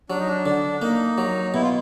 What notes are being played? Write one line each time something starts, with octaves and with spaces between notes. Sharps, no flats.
F#3 D4
D#4
D4
D3
A#3 D#4
F#3
B2 E4
F4